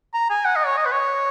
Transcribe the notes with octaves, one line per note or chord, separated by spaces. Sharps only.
A#5
G#5
F#5
D#5
C#5
D#5
B4
C#5